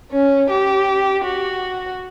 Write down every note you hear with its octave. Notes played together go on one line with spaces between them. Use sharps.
C#4
G4
F#4